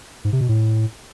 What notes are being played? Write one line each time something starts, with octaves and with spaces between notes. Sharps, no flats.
G#2
C3
B2
A2